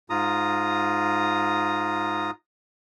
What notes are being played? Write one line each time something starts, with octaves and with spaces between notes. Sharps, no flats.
G#2 F4 A#5 D#6